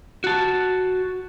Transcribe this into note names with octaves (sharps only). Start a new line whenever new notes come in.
F#4 A5